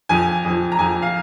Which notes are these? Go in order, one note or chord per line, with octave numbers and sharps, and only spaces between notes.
F2 F3 G#5
F2 F3
A#5
F2 F3 G#5
F5